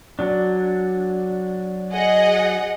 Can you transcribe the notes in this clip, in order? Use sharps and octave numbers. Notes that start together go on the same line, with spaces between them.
F#3 D4
G#4 D#5 F#5